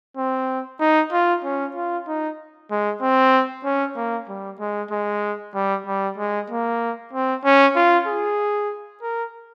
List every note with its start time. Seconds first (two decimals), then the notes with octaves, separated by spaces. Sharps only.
0.17 C4
0.80 D#4
1.12 F4
1.44 C#4
1.76 F4
2.08 D#4
2.71 G#3
3.02 C4
3.65 C#4
3.96 A#3
4.29 G3
4.60 G#3
4.91 G#3
5.55 G3
5.87 G3
6.18 G#3
6.50 A#3
7.13 C4
7.45 C#4
7.76 F4
8.07 G#4
9.02 A#4